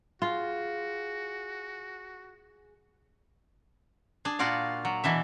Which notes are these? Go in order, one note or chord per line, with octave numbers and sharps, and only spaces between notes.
F4 F#4 G#4
D4 G#4
A#2 F4 F#4 D5 F5
F#3
B2 E3 D4 E5